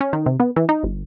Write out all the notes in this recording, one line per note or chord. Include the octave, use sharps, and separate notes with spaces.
C#4
D#3
C3
B3
E3
D#4
G1